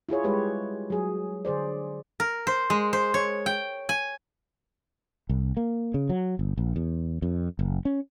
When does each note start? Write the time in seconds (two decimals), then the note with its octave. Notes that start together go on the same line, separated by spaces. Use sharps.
0.09 E4 F4 G#4 C#5
0.24 G3 G#3 G4 B4 C#5
0.90 F#3 G#4
1.45 D3 G#4 C5 D5
2.20 A#4
2.47 C5
2.70 G#3
2.93 C5
3.14 C#5
3.46 G5
3.89 G#5
5.29 C2
5.57 A#3
5.94 C#3
6.10 F#3
6.39 G1
6.58 A#1
6.76 E2
7.22 F2
7.59 F#1
7.85 C#4